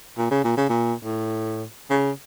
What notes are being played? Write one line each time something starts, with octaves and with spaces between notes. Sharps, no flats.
A#2
C#3
A#2
C#3
A#2
A2
C#3